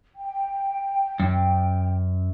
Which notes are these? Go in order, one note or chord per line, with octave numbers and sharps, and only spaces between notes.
G5
F#2